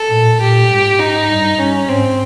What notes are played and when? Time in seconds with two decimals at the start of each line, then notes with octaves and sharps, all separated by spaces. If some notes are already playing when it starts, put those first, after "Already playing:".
Already playing: A4
0.11 A#2
0.40 A#2 G4
0.70 G#2
0.99 D#4
1.30 G2
1.59 G2 C#4
1.88 G#2 C4